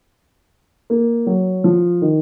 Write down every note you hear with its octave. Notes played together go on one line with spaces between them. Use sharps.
A#3
F#3
F3
D#3